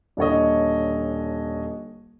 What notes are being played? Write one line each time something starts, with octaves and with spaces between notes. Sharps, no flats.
D#1 D3 C#5 D#5